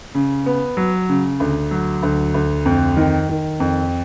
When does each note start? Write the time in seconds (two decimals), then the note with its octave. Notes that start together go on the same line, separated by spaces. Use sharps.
0.15 C#3
0.46 B3
0.77 F#3
1.09 C#3
1.40 D2
1.71 F#3
2.03 D2
2.34 D2
2.65 F2
2.97 D#3
3.29 D#3
3.60 F2